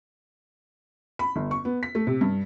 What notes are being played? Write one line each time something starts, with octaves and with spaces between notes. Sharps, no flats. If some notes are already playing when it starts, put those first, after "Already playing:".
B5
G1
C#6
B3
B6
A3
C3
G2